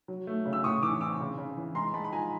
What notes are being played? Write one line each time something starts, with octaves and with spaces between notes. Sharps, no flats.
F#3
A3
C#3
E6
A2 C#6 D#6
E3 D6 E6
C4 D6 E6
C#3
C#3
E3
G#3 A#5 C6
G#3 A5 B5
B5
F3 G#5 A#5